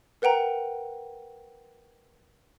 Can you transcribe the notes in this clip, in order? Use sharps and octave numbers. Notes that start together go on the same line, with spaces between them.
A#4 B4 F#5 G5 A#5